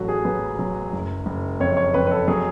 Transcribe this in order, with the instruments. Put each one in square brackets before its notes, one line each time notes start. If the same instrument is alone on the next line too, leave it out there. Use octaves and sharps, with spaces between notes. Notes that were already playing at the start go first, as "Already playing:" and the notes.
Already playing: [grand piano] A1 F#3 F#4 A4
G#4
F#3 B4
F#3
F#1
F#1
F2 C#5
C#5
F2 B4
B4
A4
F#3 G#4